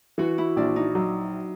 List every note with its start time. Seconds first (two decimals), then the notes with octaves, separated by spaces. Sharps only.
0.18 E3 F#4
0.38 E4
0.56 A#1 D4
0.76 D#4
0.95 F#3